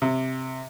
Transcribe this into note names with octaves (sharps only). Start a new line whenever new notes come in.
C3